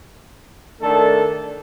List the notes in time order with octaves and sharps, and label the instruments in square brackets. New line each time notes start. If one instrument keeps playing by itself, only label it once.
[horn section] D#3 A3 D4 A4